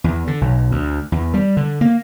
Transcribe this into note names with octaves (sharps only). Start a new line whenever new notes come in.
E2
D3
B1
D2
E2
G3
D3
A#3